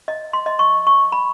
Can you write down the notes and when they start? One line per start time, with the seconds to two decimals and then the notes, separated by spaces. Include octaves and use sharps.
0.08 D#5
0.33 C6
0.46 D#5
0.59 C#6
0.87 C#6
1.12 B5